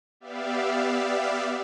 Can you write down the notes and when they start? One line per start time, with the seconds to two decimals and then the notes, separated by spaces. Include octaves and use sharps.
0.20 B3 G4 D5 E5 F5